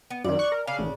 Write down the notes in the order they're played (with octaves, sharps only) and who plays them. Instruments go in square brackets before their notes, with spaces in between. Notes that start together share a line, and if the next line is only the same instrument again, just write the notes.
[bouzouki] B3
[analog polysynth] F#2 D#3 [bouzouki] D5
[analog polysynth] C#6 F#6
A#4
[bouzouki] C#3 D4 [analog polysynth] F5
[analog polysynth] A1